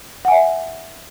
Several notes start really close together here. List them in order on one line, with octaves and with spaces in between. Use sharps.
F#5 G#5 E5